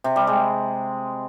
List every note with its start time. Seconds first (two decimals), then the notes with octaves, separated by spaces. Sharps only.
0.04 C3
0.16 G3
0.27 G#3